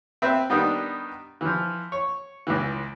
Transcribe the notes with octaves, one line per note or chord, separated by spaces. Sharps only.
C4 B4 E5
D#3 G3 B3 D4 D#4
E3 F3
C#5
C#2 E3